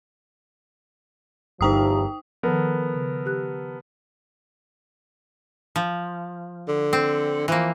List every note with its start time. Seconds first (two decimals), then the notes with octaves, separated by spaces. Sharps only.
1.61 G1 E2 F3 D#4 G4 A#4 G5 D#6
2.43 D#3 F3 B3 A4 A#4
2.94 C#3
3.26 G4 F#6
5.76 F3
6.68 D3
6.93 C4
7.48 E3 F3 A#3